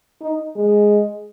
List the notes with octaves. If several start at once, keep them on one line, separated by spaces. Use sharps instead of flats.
D#4
G#3